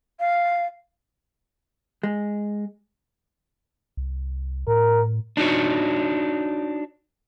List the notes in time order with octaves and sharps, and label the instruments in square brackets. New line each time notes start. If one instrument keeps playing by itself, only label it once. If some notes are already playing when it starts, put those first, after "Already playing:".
[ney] F5
[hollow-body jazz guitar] G#3
[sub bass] C2
[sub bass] A2 [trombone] A#4
[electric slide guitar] D4 D#4 F#4 C#5